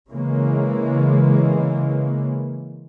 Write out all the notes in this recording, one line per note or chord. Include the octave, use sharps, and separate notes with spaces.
C#3 E3 G#3 A#3